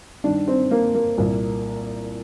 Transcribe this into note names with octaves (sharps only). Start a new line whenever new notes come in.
G2 D#3 D4
C4
A#3
A#3
C2 A#2